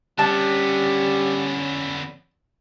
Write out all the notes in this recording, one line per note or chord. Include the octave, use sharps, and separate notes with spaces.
D3 G3 B3 C#4 A5